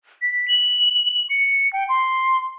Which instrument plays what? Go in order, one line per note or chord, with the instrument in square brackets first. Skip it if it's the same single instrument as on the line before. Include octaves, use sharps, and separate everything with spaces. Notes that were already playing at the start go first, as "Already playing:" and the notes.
[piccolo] B6
F#7
C#7
G5
C6